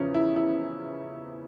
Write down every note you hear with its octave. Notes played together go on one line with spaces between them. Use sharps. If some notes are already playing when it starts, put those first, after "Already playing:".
Already playing: E2 C#3 F3 C#4
E4
E4